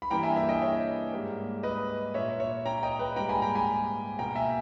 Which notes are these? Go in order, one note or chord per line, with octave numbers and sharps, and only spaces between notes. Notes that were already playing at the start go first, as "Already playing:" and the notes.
B5
G2 E3 A#3 G5 A#5
E5 G#5
E5 G#5
D#5 G5
C#5 E5
G#2 G3 A#3
B4 D#5
A#2 A#3 C#5 E5
C#5 E5
G5 A#5
D#5 G5
B4
G#2 G3 A#3 G5 A#5
G#5 B5
G5 A#5
G#5 B5
B2 A#3 G5 A#5
E5 G#5